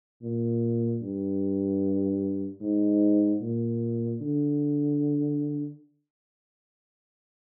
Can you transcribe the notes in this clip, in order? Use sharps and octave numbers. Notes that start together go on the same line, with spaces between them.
A#2
G2
G#2
A#2
D3